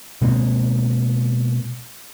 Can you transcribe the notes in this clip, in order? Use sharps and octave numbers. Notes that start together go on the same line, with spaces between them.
B2 G#3 A#3 C4